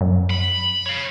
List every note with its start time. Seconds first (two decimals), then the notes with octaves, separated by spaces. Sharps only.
0.01 F#2
0.30 B5
0.86 C#5 F5